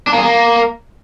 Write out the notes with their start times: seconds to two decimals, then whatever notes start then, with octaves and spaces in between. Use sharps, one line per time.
0.07 D4
0.12 A#3
0.18 G#4
0.23 A#3